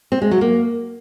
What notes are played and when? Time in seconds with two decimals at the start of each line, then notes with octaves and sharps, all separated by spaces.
0.12 C4
0.22 G#3
0.31 F#3
0.41 A#3